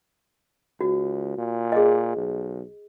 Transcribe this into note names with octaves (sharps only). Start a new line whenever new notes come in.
C#2 F#4
A#2
G#4 D#5
B1